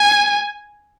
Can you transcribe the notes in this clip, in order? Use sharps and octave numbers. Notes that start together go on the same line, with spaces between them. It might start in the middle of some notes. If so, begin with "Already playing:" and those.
Already playing: G#5